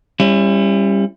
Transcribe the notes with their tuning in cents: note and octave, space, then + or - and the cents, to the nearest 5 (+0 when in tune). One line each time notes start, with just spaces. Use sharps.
G3 +20 C#4 -20 E4 +30